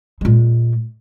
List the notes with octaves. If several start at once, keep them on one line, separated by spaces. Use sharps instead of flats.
A#2 G#3